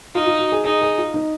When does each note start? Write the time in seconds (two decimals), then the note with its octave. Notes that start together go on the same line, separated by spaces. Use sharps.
0.15 D#4 F4
0.27 F4
0.39 F#4
0.52 G#4
0.64 D#4 G#4
0.82 G#4
0.98 F4
1.14 D#4